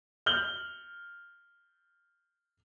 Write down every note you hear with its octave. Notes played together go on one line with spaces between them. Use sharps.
F6 G6 F#7 G7